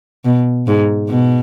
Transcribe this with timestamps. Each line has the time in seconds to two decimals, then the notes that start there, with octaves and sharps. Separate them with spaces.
0.25 B2
0.67 G#2
1.09 B2